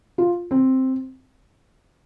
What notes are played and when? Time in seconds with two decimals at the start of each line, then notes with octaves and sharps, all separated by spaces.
0.18 F4
0.51 C4